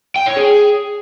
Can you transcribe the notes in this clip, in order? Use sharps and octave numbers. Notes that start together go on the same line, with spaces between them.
G5
C#5
G#4